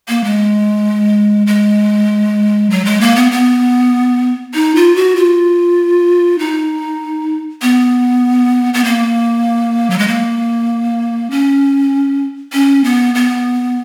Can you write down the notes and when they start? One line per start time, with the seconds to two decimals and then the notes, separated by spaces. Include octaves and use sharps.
0.09 A#3
0.24 G#3
1.47 G#3
2.70 F#3
2.85 G#3
3.01 A#3
3.16 B3
3.32 B3
4.54 D#4
4.75 F4
4.95 F#4
5.16 F4
6.39 D#4
7.62 B3
8.74 B3
8.85 A#3
9.90 F#3
9.98 G#3
10.08 A#3
11.31 C#4
12.53 C#4
12.84 B3
13.15 B3